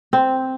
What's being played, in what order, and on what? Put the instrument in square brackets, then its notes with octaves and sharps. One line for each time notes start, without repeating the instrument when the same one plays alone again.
[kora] C4